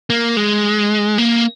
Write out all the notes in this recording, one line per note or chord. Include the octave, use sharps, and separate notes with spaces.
A#3
G#3
A#3